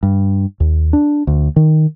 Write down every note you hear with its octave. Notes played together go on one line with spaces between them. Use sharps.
G2
D#2
D4
D2
D#3